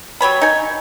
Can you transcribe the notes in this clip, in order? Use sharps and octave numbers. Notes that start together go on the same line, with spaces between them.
F#3 G3 C#5 B5
D#4 G#5